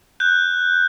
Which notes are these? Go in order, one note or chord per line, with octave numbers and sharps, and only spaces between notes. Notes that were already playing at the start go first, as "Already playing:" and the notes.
F#6 G6